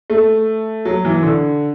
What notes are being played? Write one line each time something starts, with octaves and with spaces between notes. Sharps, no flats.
A3
F#3
E3
D3